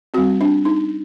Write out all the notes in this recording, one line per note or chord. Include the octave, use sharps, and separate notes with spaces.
G3 C4 F#4
D4
D#4